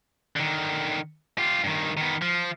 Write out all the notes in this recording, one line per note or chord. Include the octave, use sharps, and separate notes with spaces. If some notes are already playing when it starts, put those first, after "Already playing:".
D3 D#3
F4 G4
G2 D#3
D#3 B3
F3